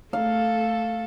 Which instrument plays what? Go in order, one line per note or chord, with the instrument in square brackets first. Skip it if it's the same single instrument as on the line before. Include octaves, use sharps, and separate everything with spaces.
[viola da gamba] A3 A4 [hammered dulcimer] F5